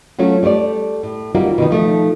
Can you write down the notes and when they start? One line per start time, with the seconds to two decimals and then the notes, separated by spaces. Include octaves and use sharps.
0.19 F#3 A3 C#4 F4 F#4
0.43 G3 A3 G4 C#5 D5
1.03 A2
1.35 G3 A#3 C4 D#4 F4 F#4
1.58 B2 D#3 D#4
1.71 F3 A3 D#4 E5